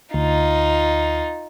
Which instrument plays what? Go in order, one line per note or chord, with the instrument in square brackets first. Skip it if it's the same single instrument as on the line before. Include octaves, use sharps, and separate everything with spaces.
[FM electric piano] D2 [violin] D#4 F4